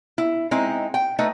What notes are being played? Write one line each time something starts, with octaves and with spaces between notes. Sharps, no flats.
E4
G#3 C4 D#4 E4
G5
A3 D#4 B4 D#5